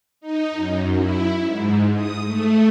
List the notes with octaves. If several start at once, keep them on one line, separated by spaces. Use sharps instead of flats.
D#4
F#2
E4
G#2
D#6
A3